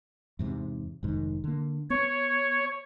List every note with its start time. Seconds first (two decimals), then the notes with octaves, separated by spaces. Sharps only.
0.39 E2 G#2 C3
1.03 F1 G#2 D#3
1.44 D3 A#3
1.90 B3 C#5